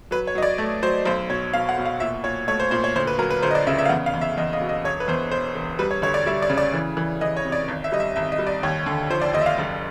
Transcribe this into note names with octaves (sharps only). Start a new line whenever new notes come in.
F#3 B4
C#5
F#3 D#5
D5
A3
F#3 C5
B1 C5
B2 C#5
B2 F5
F#5
B2
F5
A#2 E5
A#2 C#5
A3 C#5
C5
A#2 C5
C#5
D2 C5
B4
F#3 A#4
B4
D2 C5
D#5
D5
C#3 E5
E5
F5
E2 F#5
F5
E2
E5
E2 D#5
D#5
B2
D#5
E1 C#5
B4
E2 C5
E1 C5
E1
G3 B4
C#5
D2 C#5
D5
G3 E5
D5
C#3
D5
E3
E3
E3 D#5
C#5
C3
D5
G#1
E5
G3 D#5
E5
G#1 E5
D#5
G3
D5
D#2 C#5
D3
F3 C5
D5
D#2 D#5
E5
F5
F#1